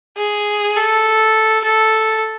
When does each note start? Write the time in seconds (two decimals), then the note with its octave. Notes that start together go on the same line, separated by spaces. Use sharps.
0.17 G#4
0.76 A4
1.64 A4